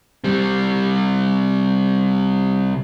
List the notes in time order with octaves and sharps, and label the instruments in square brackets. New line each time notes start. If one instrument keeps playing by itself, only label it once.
[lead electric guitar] C3 G3